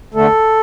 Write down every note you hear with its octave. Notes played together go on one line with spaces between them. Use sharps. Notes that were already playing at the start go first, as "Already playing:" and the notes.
E2 D3 A3 A4